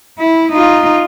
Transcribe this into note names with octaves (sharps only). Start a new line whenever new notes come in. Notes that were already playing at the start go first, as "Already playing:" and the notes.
E4
D#4 F4